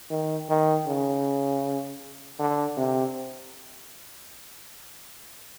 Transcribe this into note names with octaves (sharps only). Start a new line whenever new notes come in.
D#3
D#3
C#3
D3
C3